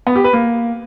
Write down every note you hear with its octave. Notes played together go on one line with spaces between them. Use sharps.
B3
G4
B4
A#3